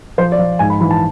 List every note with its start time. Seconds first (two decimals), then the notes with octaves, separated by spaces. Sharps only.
0.18 F3 C5
0.32 D5
0.39 F3
0.59 G#2 G#5
0.70 B5
0.80 E3 B5
0.91 A5